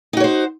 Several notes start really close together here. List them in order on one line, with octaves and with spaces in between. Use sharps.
D#4 F#4 C#5 C5